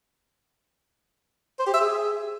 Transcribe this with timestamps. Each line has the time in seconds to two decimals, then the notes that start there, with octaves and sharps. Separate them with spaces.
1.59 C5
1.66 G4
1.74 E5
1.81 G#4